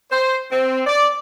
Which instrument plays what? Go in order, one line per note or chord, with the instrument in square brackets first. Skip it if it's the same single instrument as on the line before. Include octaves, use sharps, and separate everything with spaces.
[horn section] C5
C4
D5